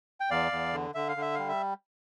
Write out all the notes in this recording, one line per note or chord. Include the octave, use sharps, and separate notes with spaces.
G5
E2 D5 F5
E2
D3
D3 E5
F5
D3 E5
G3 F5
E5